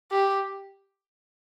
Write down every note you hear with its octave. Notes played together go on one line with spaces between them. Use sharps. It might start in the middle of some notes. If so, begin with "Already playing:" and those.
G4